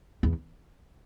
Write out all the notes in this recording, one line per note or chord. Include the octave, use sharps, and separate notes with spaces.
E2